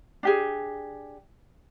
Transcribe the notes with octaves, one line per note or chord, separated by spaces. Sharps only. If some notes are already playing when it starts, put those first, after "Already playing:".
D4 G4 G#4